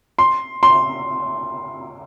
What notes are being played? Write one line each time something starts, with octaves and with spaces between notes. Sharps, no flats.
C6
C6